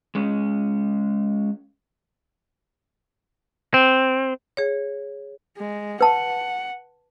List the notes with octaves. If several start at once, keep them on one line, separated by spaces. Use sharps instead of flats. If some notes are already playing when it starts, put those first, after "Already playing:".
G#3 C#4
C4
G#4 C#5
G#3
B4 F#5 A5